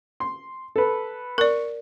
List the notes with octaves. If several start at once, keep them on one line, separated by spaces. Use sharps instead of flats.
C6
A4 B4
A#4 D5 C#6